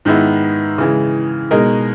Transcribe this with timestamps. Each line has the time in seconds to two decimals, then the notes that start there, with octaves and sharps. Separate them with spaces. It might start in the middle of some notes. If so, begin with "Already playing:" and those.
0.05 G#2 D#3 G#3 B3 E4
0.78 C#3 E3 G#3
1.51 B2 G#3 D#4 A#4